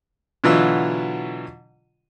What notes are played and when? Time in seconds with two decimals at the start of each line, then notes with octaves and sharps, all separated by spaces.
0.44 B2 D3 E3 F#3 F4 E6